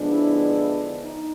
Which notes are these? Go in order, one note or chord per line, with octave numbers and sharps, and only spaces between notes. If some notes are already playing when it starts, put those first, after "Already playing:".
Already playing: D3 F3 G#3 B3 D4
E4
D#4